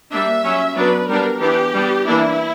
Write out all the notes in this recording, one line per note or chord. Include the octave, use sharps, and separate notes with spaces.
G3 A#3 D4 E5
F#3 C#4
F#3 B3 D4 B4
G3 B3 D4 A#4
E3 B3 D4 G4
G3 B3 D4
E3 A#3 D4 E4